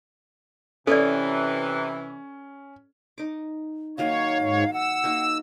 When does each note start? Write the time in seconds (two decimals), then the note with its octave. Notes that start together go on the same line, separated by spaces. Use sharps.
0.87 C3 E3 C#4 A4 D5
3.18 D#4 D6
3.98 D#3 F#3 A#3 C#5 F5
4.40 G#2 C#5
4.73 F#5 E6
5.04 A#3 D#4 F#4